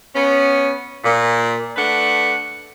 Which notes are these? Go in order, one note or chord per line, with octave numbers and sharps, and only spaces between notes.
B3 C#4
A#2
A3 D4 B4 F#5